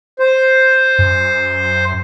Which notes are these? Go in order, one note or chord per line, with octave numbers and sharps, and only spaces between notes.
C5
F#2